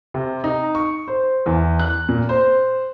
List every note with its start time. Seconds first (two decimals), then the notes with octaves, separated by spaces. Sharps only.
0.14 C3
0.44 D#4
0.75 C#6
1.08 C5
1.46 E2
1.79 F#6
2.09 A#2
2.29 C5